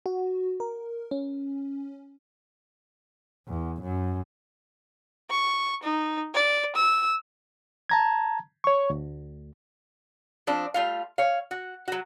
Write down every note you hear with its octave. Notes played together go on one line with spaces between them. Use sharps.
F#4
A#4
C#4
E2
F#2
C#6
D#4
D5
E6
A5 A#5 G#6
C#5 C#6
D2
F3 C4 D4
G3 A3 F4 F5
C#5 F5
F#4
F#3 F#4